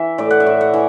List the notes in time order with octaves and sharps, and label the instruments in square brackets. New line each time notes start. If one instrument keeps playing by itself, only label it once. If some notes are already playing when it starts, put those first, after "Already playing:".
Already playing: [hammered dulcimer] E3 E5
A2 D5
F#5
E5
A2
F#5
E3